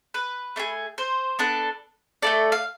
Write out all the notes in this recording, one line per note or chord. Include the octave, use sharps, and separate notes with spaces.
B4
A3 D4 G#4
C5
B3 D4 A4
A3 E4 A4 D5
F5